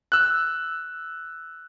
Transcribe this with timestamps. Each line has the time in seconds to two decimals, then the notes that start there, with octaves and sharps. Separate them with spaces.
0.12 E6 F#6